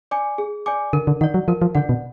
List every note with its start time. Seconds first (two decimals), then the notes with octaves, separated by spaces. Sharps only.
0.11 D5 G#5 D6
0.38 G#4
0.66 D5 G#5 D6
0.93 D3 A#4
1.07 D3
1.21 D#3 D5 F#5
1.34 F#3
1.48 F3 A#4
1.62 F3
1.75 D3 D5 F#5
1.89 B2